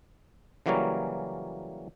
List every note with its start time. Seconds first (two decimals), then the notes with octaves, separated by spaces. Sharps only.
0.66 C#3 E3 F#3 G3 A#3 C#4